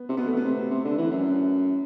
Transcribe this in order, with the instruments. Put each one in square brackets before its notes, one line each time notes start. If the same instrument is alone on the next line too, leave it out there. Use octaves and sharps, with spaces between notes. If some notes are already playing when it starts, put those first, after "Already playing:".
Already playing: [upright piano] B3
[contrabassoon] C3
[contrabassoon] B2 [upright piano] B3
[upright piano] A3
B3
[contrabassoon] C3
C3
D3
E3
F#2